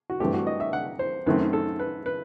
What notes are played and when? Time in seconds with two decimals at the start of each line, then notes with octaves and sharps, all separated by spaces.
0.10 F#4
0.20 G2 E3 A3 C4 G4
0.33 F#4
0.47 D#5
0.60 E5
0.73 F#5
0.99 C5
1.26 F#2 D#3 A3 C4 B4
1.53 A4
1.79 B4
2.06 B4